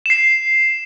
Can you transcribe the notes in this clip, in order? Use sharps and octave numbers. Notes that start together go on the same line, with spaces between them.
C7 E7